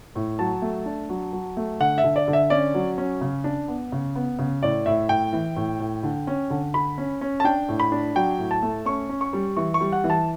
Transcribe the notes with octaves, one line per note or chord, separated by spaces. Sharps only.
A2
F#3 A5
A3
D4
F#3
F#3
A3
D3 F#5
E5
D3
D5
D3
E5
C#4 D5
F#3
C#4
C#3
D4
B3
C#3
B3
C#3
A2 D5
A2 E5
A2 G5
E3
A2
A2
D3
C#4
D3
D3 B5
C#4
C#4
A5
D4 G5
A2
B5
D4
F#3 G5
A2
A5
A3
C#4 C#6
C#4
C#6
G3
E3 C#6
C#6
G3
F#5
E3
A5